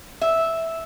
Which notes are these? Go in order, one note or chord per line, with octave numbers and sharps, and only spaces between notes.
E5